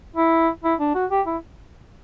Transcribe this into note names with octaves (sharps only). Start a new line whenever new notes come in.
E4
E4
D4
F#4
G4
E4